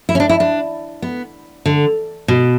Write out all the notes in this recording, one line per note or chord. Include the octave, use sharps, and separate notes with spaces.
E4
C#4
D4
E4
D4
B3
D3
B2